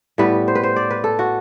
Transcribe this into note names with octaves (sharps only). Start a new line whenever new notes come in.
A2 G3 B3 B4
C5
B4
C5
D5
B4
A4
F#4